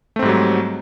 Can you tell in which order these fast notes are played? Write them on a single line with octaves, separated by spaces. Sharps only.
A3 C4 G#2 G3 F#3